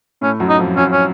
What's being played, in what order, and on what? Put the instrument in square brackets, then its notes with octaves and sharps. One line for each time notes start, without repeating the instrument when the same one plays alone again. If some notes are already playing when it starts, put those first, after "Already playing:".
[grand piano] A2 A3 [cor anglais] C#4
[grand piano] F#2 F#3
[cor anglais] D#4
[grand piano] F2 F3
[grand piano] F#2 F#3 [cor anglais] C#4
[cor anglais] C#4